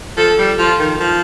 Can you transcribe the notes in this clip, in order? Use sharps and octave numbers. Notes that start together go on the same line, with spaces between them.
F3 A4
G3
F3 F4
D#3
F3